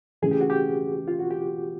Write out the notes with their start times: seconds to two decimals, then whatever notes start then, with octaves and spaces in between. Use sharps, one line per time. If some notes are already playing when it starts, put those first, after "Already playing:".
0.22 C#3 E3 A3 C#4 G#4
0.31 G4
0.41 F#4
0.50 G4
1.08 F4
1.19 F#4
1.31 G4